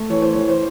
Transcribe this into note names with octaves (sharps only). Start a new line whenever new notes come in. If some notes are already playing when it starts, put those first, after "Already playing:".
Already playing: A3
E3 C#5
C5
E3 C#5
C5